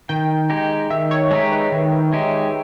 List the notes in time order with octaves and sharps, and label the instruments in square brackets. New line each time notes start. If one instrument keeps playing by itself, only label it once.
[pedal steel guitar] D#3 [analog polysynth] G5
[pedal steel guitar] G#3 D#4 G4
[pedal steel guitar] D#3 [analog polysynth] E5
[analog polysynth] C#5
[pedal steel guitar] G#3 D#4 G4 [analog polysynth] C#5
[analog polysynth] B4
[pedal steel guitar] D#3
G#3 D#4 G4